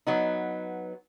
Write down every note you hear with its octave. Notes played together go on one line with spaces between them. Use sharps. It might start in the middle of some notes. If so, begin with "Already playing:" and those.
F#3 B3 D#4